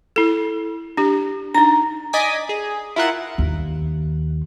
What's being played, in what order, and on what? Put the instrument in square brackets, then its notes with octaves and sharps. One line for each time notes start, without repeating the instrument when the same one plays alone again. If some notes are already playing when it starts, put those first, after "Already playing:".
[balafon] E4 A4
D4 G4
[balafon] D4 D#4 [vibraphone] A#5
[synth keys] D5 D#5 G#5 D6 B6
G#4
E4 F4 A#4 F#5
[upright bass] D#2